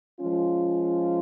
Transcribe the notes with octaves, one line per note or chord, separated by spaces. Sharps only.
F3 G#3 C#4 F4